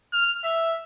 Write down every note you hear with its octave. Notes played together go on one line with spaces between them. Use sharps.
F6
E5